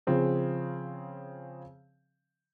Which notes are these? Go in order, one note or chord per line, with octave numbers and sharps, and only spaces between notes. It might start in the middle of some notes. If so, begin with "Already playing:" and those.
C#3 F3 C4 G#4